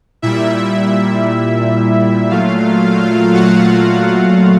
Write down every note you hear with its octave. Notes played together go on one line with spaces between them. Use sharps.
A#2 G3 E4 E5
A#2 F#3 A3 F4 F5
F#4 F#5